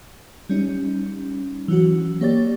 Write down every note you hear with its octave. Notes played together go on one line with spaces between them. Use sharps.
G3 C#4 D#4
E3 F#3 C#4 F#4
A#3 G4 C#5 D5 A6